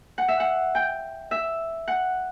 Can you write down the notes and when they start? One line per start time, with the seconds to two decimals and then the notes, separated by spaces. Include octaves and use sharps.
0.18 F#5
0.28 E5
0.40 F#5
0.75 G5
1.31 E5
1.88 F#5